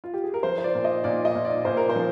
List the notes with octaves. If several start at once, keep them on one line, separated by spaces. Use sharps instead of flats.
F4
G4
G#4
A#4
F3 C5
C5
D5
A#2
D#5
A#2 D5
D#5
A#2
D5
A#2 C5
A#4
C5
F3